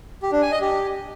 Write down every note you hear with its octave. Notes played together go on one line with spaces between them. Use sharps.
G4
D4
G#5
D#5
G4